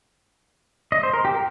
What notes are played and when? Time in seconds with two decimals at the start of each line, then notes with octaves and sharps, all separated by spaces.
0.92 D#5
1.03 C5
1.14 A#4
1.25 G4
1.35 A#4